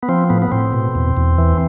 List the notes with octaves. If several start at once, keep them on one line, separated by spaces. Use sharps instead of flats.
B3
F3 C4
A2 B3
B3
A2 C4
B2
E2
E2
E3